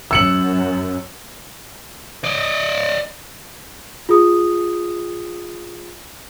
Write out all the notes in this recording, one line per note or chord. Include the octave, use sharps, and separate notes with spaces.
F#2 E6 C#7 F#7
D5 D#5
F4 G#4 D#6